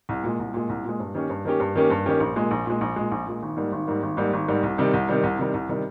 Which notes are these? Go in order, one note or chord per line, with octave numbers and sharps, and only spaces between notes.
C2
A#2 G#3
C2
A#2 G#3
C2
A#2 G#3
G2
D#3 A#3 C#4 G4
G2
D#3 A#3 C#4 G4
G2
D#3 A#3 C#4 G4
G2
D#3 A#3 C#4 G4
A#1
A#2 G#3
A#1
A#2 G#3
A#1
A#2 G#3
A#1
A#2 G#3
G#1
G#2 G3 A#3
G#1
G#2 G3 A#3
G#1
G#2 G3 A#3
G#1
G#2 G3 A#3
C2
C3 D#3 G3
C2
C3 D#3 G3
C2
C3 D#3 G3
C2
C3 D#3 G3